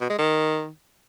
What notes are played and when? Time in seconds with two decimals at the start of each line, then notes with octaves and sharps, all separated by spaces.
0.01 B2
0.10 G#3
0.19 D#3